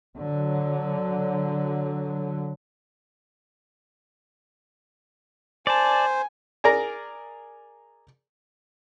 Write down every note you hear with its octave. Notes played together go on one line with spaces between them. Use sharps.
D3 F#3
C5 D5 G#5 A5
G#4 A#4 D5 A#5